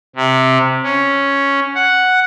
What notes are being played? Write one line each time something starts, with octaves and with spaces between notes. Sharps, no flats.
C3
C#4
F#5